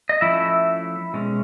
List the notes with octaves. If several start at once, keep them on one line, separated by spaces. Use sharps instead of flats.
D#5
F3 A3 C#4 E4 E5
B2 G#3 C#4